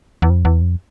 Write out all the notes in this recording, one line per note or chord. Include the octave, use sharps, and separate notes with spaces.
E2
F2
E2
F2